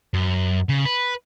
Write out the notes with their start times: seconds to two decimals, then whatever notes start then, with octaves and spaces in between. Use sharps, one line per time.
0.14 F#2
0.69 C#3
0.85 B4